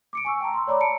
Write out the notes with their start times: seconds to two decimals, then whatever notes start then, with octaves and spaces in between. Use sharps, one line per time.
0.13 D6 C#7 D7
0.25 G#5 C#6 E6
0.41 G5 A5 A#5
0.54 C6 E6
0.67 C#5 D5 A#5 B5 D6
0.80 A5 A#5 C#7 D7